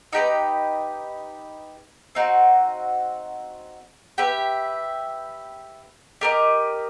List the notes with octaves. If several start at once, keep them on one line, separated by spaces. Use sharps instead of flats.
D#4 G4 B4
C4 D#4 F#4
G4 B4 E5
G4 A#4 D#5